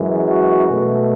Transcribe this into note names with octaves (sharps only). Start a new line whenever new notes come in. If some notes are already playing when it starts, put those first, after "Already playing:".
Already playing: F#2 E3 G#3
F#4
B2 A3